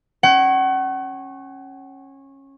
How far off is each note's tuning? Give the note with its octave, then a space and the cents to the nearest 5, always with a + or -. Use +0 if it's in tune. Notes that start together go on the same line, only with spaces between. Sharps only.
C#4 -20 F#5 +35